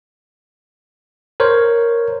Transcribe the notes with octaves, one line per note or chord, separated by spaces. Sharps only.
A#4 C5 C#5